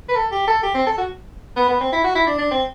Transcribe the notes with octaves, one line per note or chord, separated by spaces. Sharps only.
B4
A4
G4
A4
G4
C4
A4
F#4
B3
B3
C4
E4
F#4
E4
D4
D4
C4